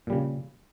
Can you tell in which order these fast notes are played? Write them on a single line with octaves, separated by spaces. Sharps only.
A#2 G3 C#3